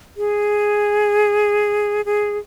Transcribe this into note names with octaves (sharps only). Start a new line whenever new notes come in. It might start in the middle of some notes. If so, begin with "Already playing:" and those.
G#4
G#4